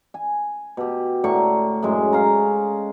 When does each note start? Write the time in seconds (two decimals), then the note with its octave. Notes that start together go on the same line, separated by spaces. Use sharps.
0.14 G#5
0.77 B2 G4
1.24 A2 D3 A#4 C#6
1.83 F#2 A2 G#3
2.13 C#4 F5 A#5